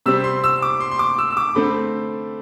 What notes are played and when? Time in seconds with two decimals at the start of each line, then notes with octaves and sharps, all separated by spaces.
0.06 C3 G3 C4 E6
0.24 C6
0.44 E6
0.62 D6
0.80 C6
0.91 C6
0.99 D6
1.18 E6
1.31 E6
1.37 D6
1.55 D3 A3 C4 B5